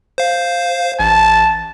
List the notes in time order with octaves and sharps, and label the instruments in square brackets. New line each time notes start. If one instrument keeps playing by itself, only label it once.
[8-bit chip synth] C5 F5
[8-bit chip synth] A1 [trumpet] A5